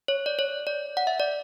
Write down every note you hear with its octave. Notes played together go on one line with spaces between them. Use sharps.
C#5
D5
C#5
D5
F#5
E5
D5